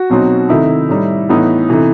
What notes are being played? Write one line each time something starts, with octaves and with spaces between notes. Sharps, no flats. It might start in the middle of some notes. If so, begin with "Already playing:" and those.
Already playing: F#4
B2 F#3 C4 D#4
C3 D#3 A3 D#4 E4
A2 G3 D#4
A2 E3 B3 D#4
C3 E3 A3 D#4